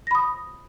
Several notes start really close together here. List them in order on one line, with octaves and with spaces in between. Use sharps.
A#6 B5 D#6